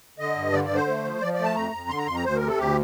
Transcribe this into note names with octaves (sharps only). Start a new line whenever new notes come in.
D3 D#5
G2
D3 D5
D5
D3
C5
A3
F3
F3 D5
D5
A3
A5
F2 A#5
F2
D3 C6
A#5
F2 C6
A#5
D2 C5
A#4
C3 A4
D2 G4